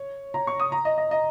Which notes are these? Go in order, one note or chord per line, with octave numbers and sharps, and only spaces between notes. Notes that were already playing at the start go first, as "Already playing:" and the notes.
Already playing: C#5
A#5
C#6
D#6
A#5
D#5
D#5
D#5